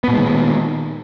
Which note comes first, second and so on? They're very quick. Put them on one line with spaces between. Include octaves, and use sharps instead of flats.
B3 A#2 G#3 D#3